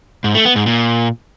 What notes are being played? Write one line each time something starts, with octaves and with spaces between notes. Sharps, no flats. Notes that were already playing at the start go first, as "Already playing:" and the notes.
G#2
A3
B3
G#2
A#2